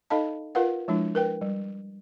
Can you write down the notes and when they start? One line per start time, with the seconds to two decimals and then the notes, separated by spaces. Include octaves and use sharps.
0.10 D#4 A4 D#5 F5 A5
0.55 F4 A#4 B4 F5 F#5
0.88 F3 G#3 D4 E4
1.15 A#4 B4 G5
1.41 G3